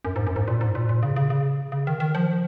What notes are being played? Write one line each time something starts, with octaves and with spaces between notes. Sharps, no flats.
F#2
G#2
F#2
G#2
A#2
G#2
A#2
A#2
C#3
C#3
C#3
C#3
D#3
D#3
F3